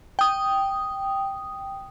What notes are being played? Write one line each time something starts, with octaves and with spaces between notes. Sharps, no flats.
G5 D#6